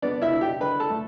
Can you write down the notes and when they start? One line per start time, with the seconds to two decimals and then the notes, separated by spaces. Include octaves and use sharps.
0.02 B3 D4 D5
0.21 E4 E5
0.32 D4
0.41 G4 G5
0.60 D3 B4 B5
0.80 A4 A5
0.90 A3